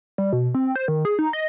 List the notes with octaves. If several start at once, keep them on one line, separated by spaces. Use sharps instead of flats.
G3
B2
C4
C5
D#3
G#4
D#4
D#5